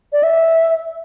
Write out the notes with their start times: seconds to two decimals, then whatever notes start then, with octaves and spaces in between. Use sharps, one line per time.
0.13 D5
0.23 E5